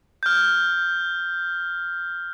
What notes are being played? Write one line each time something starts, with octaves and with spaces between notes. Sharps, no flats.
F6 G6